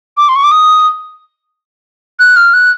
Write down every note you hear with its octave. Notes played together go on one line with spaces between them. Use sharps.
D6
C6
C#6
D6
D#6
F#6
F6
F#6